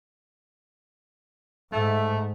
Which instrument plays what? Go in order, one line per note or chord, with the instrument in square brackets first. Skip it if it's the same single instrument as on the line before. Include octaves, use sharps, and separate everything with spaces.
[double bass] G#2 [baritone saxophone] A3 [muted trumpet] E5